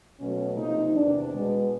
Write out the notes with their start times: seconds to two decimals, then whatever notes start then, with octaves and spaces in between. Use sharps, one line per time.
0.19 B2 F#3 A3 C#4
0.57 C3 F3 A#3 D#4
0.94 E2 C3 D#3 D4
1.32 B2 G#3 B3